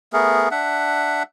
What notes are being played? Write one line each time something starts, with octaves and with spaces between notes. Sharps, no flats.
A3 B3 G#4 A#4
D4 E5 F#5